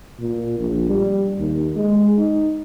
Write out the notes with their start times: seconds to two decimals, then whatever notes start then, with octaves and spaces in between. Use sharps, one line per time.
0.20 A#2
0.59 A#1
0.89 G3
1.39 D#2
1.76 G#3
2.18 D#4